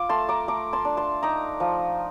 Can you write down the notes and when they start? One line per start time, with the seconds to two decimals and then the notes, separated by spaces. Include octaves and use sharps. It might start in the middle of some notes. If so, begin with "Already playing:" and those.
Already playing: F4 D6
0.09 A3 A5 C6
0.29 A#5 D6
0.48 A3 A#5 D6
0.73 A5 C6
0.85 D4
0.97 A5 C6
1.23 D#4 A#5 D6
1.60 F3